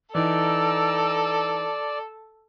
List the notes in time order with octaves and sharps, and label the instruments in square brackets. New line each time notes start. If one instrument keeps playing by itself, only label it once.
[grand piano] E3 D#4 [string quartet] A4 [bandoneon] D5 [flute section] G5 A#5 E6